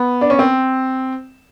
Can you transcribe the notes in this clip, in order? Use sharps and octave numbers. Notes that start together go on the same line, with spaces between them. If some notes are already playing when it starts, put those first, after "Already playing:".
Already playing: B3
D4
C#4
C4